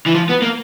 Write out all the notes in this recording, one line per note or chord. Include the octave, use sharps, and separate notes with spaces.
E3
F3
B3
A#3